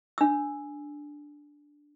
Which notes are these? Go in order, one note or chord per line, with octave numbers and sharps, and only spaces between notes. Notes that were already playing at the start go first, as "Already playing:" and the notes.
D4 E6